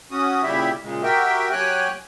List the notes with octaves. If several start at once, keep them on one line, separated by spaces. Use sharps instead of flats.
C#4 F#4 D#6
A#2 C#3 G3 E4 G4 E5
A#2 C#3 G#3
F#4 G4 A#4 E5 G5
F#3 G4 C#5 G5 G#5 F#6